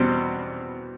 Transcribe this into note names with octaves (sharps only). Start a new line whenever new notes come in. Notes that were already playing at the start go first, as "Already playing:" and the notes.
Already playing: E2 B2 G3 C4